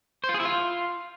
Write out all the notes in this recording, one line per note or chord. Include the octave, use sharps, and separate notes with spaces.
C5
F4
G#4
E4
F4